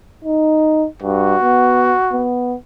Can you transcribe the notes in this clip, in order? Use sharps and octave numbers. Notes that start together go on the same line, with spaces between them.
D#4
G2 F#4
B3
B3